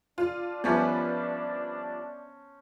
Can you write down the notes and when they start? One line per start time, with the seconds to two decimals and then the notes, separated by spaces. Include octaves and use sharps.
0.18 D4 F4
0.64 F3 G3 B3 C#4 B4 C5 E5 A5